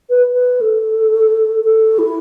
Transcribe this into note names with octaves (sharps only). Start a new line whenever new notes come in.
B4
B4
A4
A4
E4